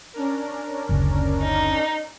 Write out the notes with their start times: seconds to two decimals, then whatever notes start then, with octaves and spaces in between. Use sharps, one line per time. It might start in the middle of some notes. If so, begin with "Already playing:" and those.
0.14 C#4 D4 A#4
0.89 F#1 D2 C#3
1.42 D#4